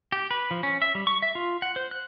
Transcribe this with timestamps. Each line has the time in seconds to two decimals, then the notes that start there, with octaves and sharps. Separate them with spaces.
0.12 G4
0.31 B4
0.51 F3
0.63 C#4
0.82 E5
0.95 G3
1.07 C#6
1.22 E5
1.35 F4
1.62 F#5
1.76 C5
1.91 F#6